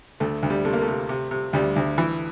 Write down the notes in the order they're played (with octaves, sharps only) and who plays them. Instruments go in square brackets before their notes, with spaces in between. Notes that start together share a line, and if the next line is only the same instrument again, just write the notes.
[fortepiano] D2 A3
D2
G3
C3 A3
A#3
A3
C3
C3
C3
D2 G3
D2
E3